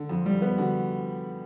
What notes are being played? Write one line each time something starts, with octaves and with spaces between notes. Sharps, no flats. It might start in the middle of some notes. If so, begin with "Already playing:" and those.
Already playing: D3
F2
G3
B3
D3 F#4